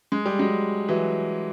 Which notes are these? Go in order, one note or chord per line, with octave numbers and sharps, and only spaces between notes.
G#3
G3
F#3 G#3
E3 F#3